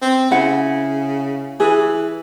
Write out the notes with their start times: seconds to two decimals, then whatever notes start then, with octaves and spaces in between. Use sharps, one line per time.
0.02 C4
0.31 C#3 E4 F#5
1.60 E3 G#4